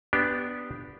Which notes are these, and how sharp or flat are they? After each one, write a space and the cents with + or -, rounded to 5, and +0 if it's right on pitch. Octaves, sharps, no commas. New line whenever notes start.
B3 +0 D4 +0 G4 -10